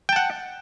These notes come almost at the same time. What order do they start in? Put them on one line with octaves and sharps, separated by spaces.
G5 A5 F#5